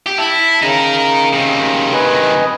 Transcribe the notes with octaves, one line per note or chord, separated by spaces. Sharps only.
G4
E4 A5
C#3 D#4 A#4
C3 D#3
B4 D#5 G#5